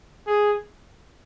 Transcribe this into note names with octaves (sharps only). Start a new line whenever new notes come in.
G#4